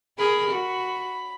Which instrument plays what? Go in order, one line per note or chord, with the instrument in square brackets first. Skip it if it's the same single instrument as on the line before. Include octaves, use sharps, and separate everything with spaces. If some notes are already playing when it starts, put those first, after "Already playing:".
[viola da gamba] G#4 A#4 [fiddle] B5
[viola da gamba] F#4